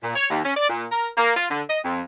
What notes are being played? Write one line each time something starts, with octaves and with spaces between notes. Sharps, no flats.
A#2
C#5
D#2
C#4
D5
A#2
A#4
A#3
F4
D3
D#5
F2